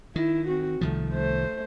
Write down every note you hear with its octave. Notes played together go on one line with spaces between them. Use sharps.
D#3 E4
C4 F#4
C2 D#3 F3 A3
A3 C5